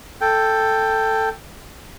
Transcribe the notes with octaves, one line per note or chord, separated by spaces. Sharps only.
A4 G5